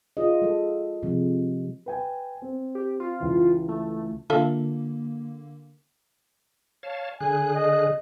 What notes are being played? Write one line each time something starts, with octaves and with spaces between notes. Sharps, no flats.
F4 G#4 D#5
G#3 A4
C3 F3 G#3
B4 G5 G#5
C4
G4
F4
C#2 E3
A3
D3 A#3 F4 A4 E5
C#5 F5 A5
D3 G#4 G#5 F#6
D#5